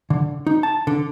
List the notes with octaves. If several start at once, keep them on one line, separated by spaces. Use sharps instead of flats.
D3
D#4
A5
D3